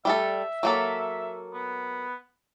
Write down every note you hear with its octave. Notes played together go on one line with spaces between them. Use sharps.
G3 A3 A4 E5
F#3 A#3 A4
B3